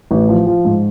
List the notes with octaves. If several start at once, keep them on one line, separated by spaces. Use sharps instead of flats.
A1
F3
F3
G#2